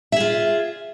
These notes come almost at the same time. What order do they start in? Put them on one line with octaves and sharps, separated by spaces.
E5 G#4 F4